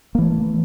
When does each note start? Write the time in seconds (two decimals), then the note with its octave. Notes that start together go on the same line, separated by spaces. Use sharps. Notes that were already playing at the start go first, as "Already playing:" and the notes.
0.15 A#3
0.18 E3
0.22 A3